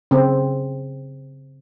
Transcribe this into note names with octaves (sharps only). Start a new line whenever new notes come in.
C#3 C4